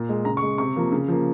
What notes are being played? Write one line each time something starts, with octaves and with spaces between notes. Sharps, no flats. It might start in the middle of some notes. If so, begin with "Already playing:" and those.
Already playing: A#2
G#3
C#3 A#5
C#6
G#3
C3 C#6
F3 A#3
C#3
F3 A#3